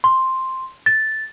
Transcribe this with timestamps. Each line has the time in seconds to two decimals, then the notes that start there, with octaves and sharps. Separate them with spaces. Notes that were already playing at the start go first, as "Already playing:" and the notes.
0.04 C6
0.86 A6